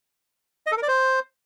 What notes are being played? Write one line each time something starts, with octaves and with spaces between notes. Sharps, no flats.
D#5
A4
A#4
D5
C5